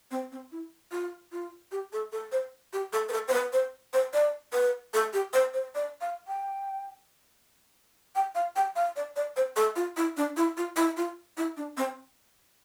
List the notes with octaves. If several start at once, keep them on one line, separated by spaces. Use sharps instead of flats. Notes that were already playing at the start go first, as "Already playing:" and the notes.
C4
C4
E4
F4
F4
G4
A4
A4
C5
G4
A4
B4
A4
C5
B4
C5
C5
D5
B4
A4
G4
C5
C5
D5
F5
G5
G5
F5
G5
F5
D5
D5
C5
A4
F4
E4
D4
E4
F4
E4
F4
E4
D4
C4